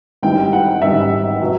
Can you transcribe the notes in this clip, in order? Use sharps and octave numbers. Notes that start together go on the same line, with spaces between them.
G#1 G#2 E3 G3 G5
F#5
G#1 G#2 E3 G3 E5
B2 F#3